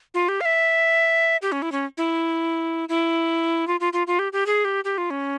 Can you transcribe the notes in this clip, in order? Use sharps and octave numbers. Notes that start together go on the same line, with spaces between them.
F4
G4
F5
E5
G4
C#4
E4
C#4
E4
E4
F4
F4
F4
F4
G4
G4
G#4
G4
G4
F4
C#4